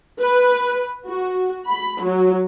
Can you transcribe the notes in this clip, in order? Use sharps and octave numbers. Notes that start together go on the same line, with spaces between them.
B4
F#4
B5
F#3